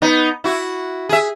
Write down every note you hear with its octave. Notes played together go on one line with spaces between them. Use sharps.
B3 D#4
E4 F#4
G#4 E5